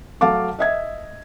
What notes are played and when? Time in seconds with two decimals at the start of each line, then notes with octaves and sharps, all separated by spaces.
0.21 F#3 A3 F5 A5 D6
0.59 D#5 E5 G#6